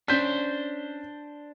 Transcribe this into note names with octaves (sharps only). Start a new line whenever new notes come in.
C#4 D4 C5 G6 B6